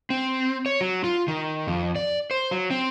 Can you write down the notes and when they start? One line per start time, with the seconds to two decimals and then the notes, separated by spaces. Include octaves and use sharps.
0.10 C4
0.66 C#5
0.81 F#3
1.04 F4
1.28 D#3
1.67 F2
1.96 D5
2.31 C5
2.51 F#3
2.71 C4